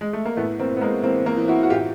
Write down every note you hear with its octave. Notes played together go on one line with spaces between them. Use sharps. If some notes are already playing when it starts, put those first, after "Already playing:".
G#3
A3
A#3
A2 A3 B3
A#3 C4
A2
B3
G#3 A#3
E3 A#3 C4
A#3 C4
E3
E4 F#4
F#4
A2 F4 G4